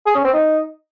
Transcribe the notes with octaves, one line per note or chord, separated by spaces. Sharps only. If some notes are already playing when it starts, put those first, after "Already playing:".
G#4
C#4
C4
D#4